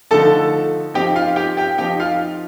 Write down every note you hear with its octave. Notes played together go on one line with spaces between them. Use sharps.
D3 F3 A3 D#4 A4 A5
F3 C4 D#4 G4 G5
F4 F5
G4 G5
G4 G5
F3 C4 D#4 G4 G5
F4 F5